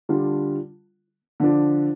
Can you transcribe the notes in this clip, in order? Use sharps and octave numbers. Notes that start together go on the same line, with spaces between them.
D3 G3 D4 F4
D3 F3 D4